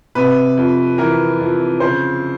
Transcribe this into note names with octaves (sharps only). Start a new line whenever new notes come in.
C3 B4
F2
E3 A#4
F2
C#3 C5